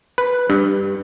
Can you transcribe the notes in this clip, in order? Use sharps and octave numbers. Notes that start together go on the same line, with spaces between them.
B4
G2